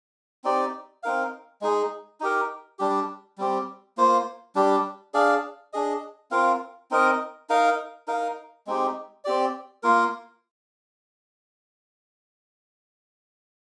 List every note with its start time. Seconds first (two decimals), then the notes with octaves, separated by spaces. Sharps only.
0.44 C4 D#4 G4 D5
1.03 C4 D#4 A#4 F5
1.61 G#3 D#4 G#4
2.20 D#4 G4 A#4
2.79 G3 D4 G4
3.38 G3 C4 G4
3.97 A#3 F4 C5
4.55 G3 D4 G4
5.14 D4 G#4 D5 F5
5.73 D4 G#4 D#5
6.31 C4 F4 A#4 F5
6.91 C4 D#4 A#4 D#5
7.49 D#4 A#4 F5
8.08 D#4 A#4 F5
8.67 G#3 C4 D#4 G4
9.24 C4 G4 D5
9.83 A#3 F4 A#4